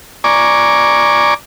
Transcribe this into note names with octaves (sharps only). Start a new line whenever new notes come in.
D5 G#5 A#5 C#6 D6